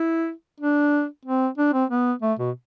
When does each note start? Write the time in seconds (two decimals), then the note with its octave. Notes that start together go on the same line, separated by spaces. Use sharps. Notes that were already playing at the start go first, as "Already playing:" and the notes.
Already playing: E4
0.60 D4
1.25 C4
1.58 D4
1.73 C4
1.90 B3
2.22 A3
2.39 B2